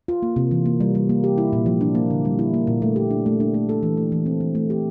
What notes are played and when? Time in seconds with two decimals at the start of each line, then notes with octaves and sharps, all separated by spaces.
0.08 F4
0.22 A#3
0.36 C3
0.51 E3
0.66 A#3
0.80 G3
0.95 G3
1.09 A#3
1.24 G4
1.38 E4
1.53 A#2
1.66 F3
1.81 D4
1.95 A#3
2.10 D3
2.25 G3
2.39 E4
2.54 A#3
2.67 A#2
2.82 A3
2.96 G4
3.11 D4
3.26 A3
3.40 D4
3.54 A3
3.69 A4
3.83 E3
3.97 A3
4.12 E3
4.26 C4
4.40 E3
4.55 A3
4.70 G4